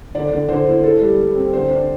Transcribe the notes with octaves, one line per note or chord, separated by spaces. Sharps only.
D3 D5
D3
D3 C5
E4
E4 A4
G3
G3
C4
D3 C5
D4